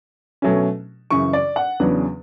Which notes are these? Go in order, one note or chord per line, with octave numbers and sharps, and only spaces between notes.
B2 F#3 A3 C#4
F#2 C#3 E3 C#6
D5
F#5
E2 C#3 F#3 B3 D4